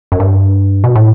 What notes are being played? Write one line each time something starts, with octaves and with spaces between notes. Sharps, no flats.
F#2
G2
B2
A2